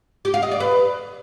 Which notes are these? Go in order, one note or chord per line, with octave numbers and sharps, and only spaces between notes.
G4
F5
D#5
D5
B4